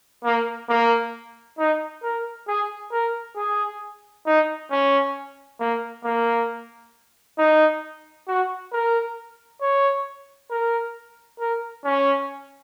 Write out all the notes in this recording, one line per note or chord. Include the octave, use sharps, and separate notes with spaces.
A#3
A#3
D#4
A#4
G#4
A#4
G#4
D#4
C#4
A#3
A#3
D#4
F#4
A#4
C#5
A#4
A#4
C#4